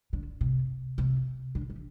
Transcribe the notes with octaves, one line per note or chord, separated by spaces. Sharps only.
D3
C3
C3
D3
E3